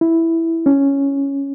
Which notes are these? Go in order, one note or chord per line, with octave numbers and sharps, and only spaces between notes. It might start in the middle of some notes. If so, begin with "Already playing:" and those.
E4
C#4